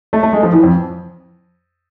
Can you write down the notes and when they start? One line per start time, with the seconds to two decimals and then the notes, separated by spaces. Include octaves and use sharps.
0.13 A3
0.23 A3
0.33 G#3
0.43 F3
0.53 E3
0.63 F2